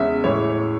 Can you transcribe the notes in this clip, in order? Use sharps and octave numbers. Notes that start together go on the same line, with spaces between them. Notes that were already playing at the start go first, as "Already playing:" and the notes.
Already playing: E2 C#3 G#3 C#4 E5
A2 E3 G#3 C#5